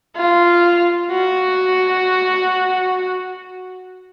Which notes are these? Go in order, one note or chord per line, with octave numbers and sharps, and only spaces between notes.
F4
F#4